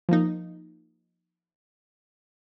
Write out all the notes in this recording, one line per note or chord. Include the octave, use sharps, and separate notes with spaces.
F3 A#3 D#4